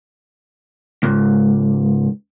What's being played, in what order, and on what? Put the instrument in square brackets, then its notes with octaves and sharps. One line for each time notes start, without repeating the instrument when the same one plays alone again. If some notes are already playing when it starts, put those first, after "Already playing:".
[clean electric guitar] C#2 G#2